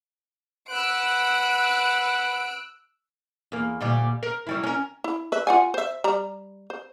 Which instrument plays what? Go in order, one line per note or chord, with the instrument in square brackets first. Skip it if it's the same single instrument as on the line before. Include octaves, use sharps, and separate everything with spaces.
[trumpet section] B4 F#5 [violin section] E6 F#6 D7
[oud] E2 A#3
D2 A#2 G3
A#4
F#3 G3 E4
C#4 A#4
[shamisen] E4
B4 E5
F4 F#5 G#5
C5 E5
G3 A#5
C5